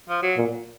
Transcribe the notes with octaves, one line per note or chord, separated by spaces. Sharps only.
F3
F#3
A#2